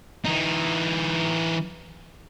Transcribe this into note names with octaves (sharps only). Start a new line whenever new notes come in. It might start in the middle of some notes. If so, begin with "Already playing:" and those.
E3 D#4